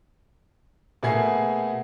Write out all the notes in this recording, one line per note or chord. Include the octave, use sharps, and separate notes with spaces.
B2 A3 A#3 G#4 G#6 C7